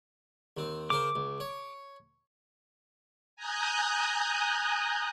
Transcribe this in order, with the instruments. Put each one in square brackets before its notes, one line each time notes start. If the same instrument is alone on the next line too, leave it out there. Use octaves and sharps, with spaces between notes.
[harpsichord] D#2 C4
[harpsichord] C#3 A#4 C5 [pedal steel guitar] D6
[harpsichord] C#2
C#5
[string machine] G#5 A#5 D#6 F#6 G6